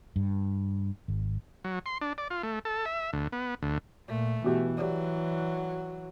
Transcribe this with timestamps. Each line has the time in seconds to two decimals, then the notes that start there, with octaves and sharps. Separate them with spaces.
0.16 G2
1.08 G#1
1.64 F#3
1.86 C6
2.01 D4
2.18 D5
2.30 F4
2.43 A3
2.65 A4
2.85 E5
3.13 D2
3.32 B3
3.63 D2
4.08 A#2 A3
4.44 B2 E3 F#4 G4
4.77 F#3 G4 D5